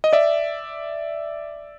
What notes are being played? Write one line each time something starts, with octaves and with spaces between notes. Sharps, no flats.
D#5
D5 E5